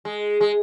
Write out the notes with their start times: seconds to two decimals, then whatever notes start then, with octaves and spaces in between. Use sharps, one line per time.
0.05 G#3
0.41 G#3